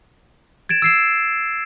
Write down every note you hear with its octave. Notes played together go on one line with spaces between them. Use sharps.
G#6 A6 D7 E7
E6 C7 E7